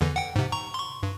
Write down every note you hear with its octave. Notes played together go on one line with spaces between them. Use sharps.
E2 D3 E3
F#5 G5
G#2 C3
A#5 C#6
C6 C#6
G2